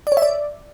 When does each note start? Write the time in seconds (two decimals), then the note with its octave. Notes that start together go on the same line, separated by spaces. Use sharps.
0.07 D5
0.12 C#5
0.17 E5
0.22 D5